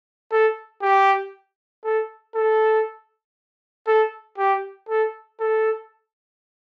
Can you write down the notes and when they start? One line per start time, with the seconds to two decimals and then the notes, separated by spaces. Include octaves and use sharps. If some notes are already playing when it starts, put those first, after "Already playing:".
0.31 A4
0.82 G4
1.84 A4
2.35 A4
3.87 A4
4.38 G4
4.89 A4
5.40 A4